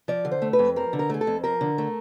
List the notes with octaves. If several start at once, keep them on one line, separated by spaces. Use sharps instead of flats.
F3 D5
D3
C5
A3
B4
F2
F3 A#4
D3
A#4
A3 G#4
A4
F2
F3 A#4
D3
A3